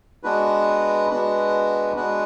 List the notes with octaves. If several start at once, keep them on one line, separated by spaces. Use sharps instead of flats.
G#3 B3 D4 F#4 B4
G#3 B3 D4 F#4 B4
G#3 B3 D4 F#4 B4